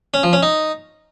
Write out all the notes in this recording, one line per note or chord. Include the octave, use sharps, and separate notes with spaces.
C#4
F3
C#4
D#4